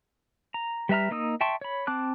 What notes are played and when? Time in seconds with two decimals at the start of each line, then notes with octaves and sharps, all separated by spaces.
0.54 A#5
0.89 G3 B4 E5 A#5 F6
1.11 A#3 D#4 D#6 E6
1.41 E5 G5 A5 C6 C#6
1.61 C#5 B5
1.87 C4 A5 D6 F#6